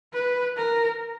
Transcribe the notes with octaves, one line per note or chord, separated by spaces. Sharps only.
B4
A#4